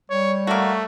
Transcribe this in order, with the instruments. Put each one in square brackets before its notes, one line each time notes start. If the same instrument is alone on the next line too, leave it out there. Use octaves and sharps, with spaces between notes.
[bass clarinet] G3 [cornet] C#5
[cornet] A3 [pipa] A#3 F#4